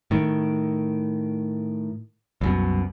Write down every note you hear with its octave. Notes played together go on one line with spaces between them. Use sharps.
A2 D#3
C2 F#2 B2